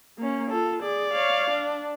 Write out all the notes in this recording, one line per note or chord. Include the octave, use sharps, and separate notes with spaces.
A#3 C#4
F4 A4
G#4 D5
C#5 F5
D4